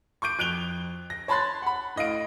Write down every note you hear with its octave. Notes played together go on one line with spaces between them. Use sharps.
C#6 D6 G6 D7
F2 F#6 D7 F7 G7
A#6
C#5 A5 B5 C6 F#6 A6
F#5 B5
A2 D#5 F5 D7